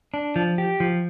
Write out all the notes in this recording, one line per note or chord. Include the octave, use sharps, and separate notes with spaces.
D4
F3
G4
F3